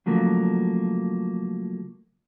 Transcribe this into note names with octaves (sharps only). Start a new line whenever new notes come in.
C#3 F3 F#3 A3 A#3